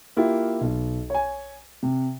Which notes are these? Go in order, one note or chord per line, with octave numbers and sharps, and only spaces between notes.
A#3 E4 F4 G4
B1
C#5 G#5
C3